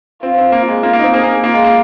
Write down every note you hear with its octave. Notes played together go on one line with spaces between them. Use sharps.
C4 F4
C4
A#3
G#3
A#3 F4
A#3
D#4
C4
A#3 G#4
A#3
A#3 F4
G#3
A#3